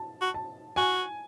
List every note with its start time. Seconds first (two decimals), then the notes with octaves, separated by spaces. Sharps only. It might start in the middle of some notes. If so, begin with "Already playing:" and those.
Already playing: A5
0.21 F#4
0.34 A5
0.76 F#4 G#5